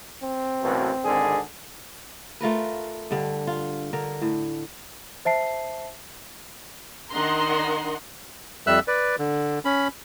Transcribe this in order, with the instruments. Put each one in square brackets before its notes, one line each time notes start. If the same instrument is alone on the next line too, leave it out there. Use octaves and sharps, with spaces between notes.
[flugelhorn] C4
[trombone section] A1 F#2 B2
G#1 D3 G#4
[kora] A3 F4 A#4 B4
G2 D3
F4
D3 A#4
A2
[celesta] C5 E5 A5 C7
[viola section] D#3 D4 D#5 F#5 A#5 C6
[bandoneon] F2 G3 E5 E6 F#6
B4 D5
D3
C#4 B5